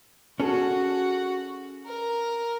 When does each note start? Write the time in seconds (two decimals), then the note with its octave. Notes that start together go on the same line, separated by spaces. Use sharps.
0.40 C#4 F#4 G#4 A4
1.86 A#4